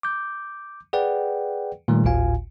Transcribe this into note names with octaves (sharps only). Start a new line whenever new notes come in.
D6 G6
G#4 B4 D5 F#5 G5
A#2 D#3 G3 A3
G#1 D2 A2 F4 F5 G#5